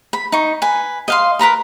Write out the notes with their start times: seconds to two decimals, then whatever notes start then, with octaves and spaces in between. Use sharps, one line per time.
0.13 B5
0.32 D#4 C#6
0.62 B4 G#5
1.08 D#5 F5 C6
1.39 A#4 B4 A#5 B5